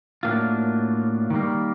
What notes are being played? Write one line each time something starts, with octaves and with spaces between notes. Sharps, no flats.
A2 F#3 A#3 D4 F4
D#3 G3 A#3